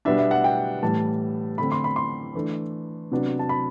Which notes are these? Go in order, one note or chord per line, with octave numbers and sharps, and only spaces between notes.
B2 G3 B3 D4 E5
E5
F#5
G5
A2 E3 G3 A5
D3 A3 C4 B5
C6
B5
C6
E3 A3 D4
C3 F#3 B3 D4
A5
B5